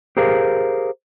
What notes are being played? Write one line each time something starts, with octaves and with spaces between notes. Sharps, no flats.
G4 G#4 A#4 C5 F5